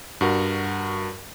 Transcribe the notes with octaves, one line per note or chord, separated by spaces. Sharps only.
G2 F#4 A#4